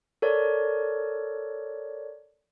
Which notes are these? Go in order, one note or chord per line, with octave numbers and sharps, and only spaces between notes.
A4 A#4 C#5 D5